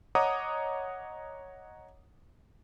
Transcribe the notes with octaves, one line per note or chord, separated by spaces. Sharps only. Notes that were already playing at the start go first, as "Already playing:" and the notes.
C#5 D#5 F#5 A#5 D6 D#6